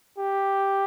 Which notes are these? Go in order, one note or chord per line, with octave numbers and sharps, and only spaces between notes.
G4